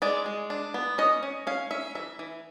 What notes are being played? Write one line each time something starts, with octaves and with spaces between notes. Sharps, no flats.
G#3 D5
G#3
D4
B3
C#4 D#5
C#4
C#4 F5
C#4 E5
E3 E5
E3